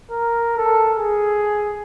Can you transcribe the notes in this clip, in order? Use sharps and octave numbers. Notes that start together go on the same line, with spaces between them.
A#4
A4
G#4